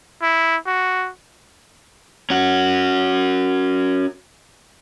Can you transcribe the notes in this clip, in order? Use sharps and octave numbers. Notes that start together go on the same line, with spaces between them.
E4
F#4
C#4 F#4